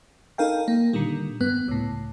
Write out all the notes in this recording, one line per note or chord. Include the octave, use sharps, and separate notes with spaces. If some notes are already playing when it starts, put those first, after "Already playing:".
D#4 A4 A#4 F5 G5
A#3
A#2 D3 D#3 G3
G2 B3 F#6
C#2 A2